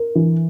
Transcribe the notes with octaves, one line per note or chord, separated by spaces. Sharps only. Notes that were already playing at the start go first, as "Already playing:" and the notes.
Already playing: A#4
E3